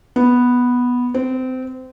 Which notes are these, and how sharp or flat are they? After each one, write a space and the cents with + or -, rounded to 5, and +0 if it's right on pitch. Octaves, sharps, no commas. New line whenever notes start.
B3 -5
C4 -25